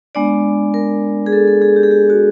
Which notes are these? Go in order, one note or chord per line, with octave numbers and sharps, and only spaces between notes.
G#3 B3 D4 D5
A#4
G#4
A4
A4
G#4
G4
G#4
G4
F#4